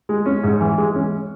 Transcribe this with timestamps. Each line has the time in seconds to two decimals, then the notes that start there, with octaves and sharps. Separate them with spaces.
0.09 G#3
0.26 C#4
0.43 G#2
0.60 E3
0.78 G#3
0.95 C#4